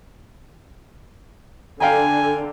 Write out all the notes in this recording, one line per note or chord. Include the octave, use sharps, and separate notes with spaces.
D3 F5 G5 G#5 A#5